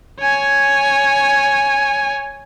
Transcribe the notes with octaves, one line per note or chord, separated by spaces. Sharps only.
C#5 G#5